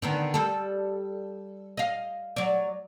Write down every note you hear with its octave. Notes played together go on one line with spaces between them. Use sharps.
D3 D#3 B3
G3 A4
D#5 F5
F#3 D5